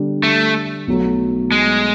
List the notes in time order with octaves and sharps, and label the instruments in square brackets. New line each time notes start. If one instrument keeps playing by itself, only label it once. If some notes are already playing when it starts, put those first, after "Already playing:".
Already playing: [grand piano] D3 G3 B3 D4 G4
[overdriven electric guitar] A3
[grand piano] B1 B2 F#3 A3
[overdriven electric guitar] G#3